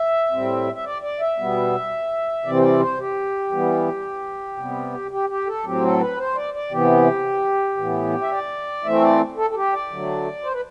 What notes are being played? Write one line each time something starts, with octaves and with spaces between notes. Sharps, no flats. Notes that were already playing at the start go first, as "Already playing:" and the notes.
Already playing: E5
A2 G3 C4
E5
D5
D5
E5
B2 G3 B3
C3 E3 G3 C4 D5
C5
D5
C5
G4
E3 G3 B3
C3 G3 B3
G4
G4
A4
A2 F#3 C4 G4
A4
B4
C5
D5
D5
C3 E3 B3 G4
A2 E3 B3
E5
D5
E3 A3 C4 E5
D5
A4
A4
G4
D5
D3 F#3 A3
C5
B4